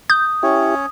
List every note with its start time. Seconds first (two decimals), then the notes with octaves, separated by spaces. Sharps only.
0.10 D#6 G6
0.43 C#4 E4 G4 C#5